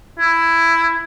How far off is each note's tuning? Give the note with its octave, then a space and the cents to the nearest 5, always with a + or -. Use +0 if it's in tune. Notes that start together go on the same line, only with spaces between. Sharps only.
E4 +10